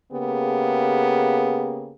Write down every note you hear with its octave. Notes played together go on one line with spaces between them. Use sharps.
C#3 A#3 B3 G4 G#4